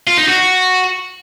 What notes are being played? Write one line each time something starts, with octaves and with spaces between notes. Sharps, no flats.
F4
D#4
F#4